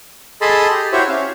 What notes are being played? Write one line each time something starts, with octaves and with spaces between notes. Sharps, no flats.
G#4 A4 D#5 A5 B5 C6
G4
E4 F#4 G4 C5 C#5 E5
C#4 F5